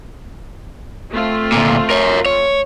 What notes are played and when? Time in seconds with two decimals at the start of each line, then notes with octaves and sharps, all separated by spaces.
1.12 A3 C4 F4
1.52 D2 A#2
1.90 A#4 C#5
2.26 C#5